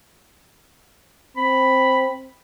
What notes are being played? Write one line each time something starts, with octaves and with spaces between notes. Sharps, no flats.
C4 B5